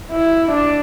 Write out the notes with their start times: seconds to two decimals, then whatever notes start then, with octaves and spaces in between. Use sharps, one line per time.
0.11 E4
0.51 D4